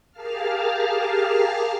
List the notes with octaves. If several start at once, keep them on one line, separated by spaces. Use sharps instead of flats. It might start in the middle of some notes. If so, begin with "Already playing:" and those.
G4 G#4 A#4 F5 A5 F6